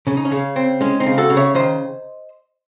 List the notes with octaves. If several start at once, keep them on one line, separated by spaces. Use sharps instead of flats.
C#3 C#4
D#4
C#4
C#3
C4
G#3 C#4
C4 D#4
C#3
F#4 A4
C#3
C#5 E5
D#3 C5 D#5